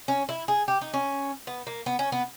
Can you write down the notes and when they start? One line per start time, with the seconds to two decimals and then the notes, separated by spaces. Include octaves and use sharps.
0.08 C#4
0.29 E4
0.48 G#4
0.68 G4
0.81 D#4
0.93 C#4
1.47 B3
1.67 A#3
1.86 B3
1.99 C#4
2.12 B3